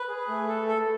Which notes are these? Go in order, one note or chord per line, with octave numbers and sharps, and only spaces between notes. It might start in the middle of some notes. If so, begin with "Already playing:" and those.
Already playing: B4
G#4
A3
A4
A4